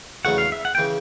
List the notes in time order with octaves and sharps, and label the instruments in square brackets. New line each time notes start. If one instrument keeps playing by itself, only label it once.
[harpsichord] E2 C#3 F#3 A3 [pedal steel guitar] F#5
[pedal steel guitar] F5
E5
F#5
[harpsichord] C#3 E3 [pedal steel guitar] G5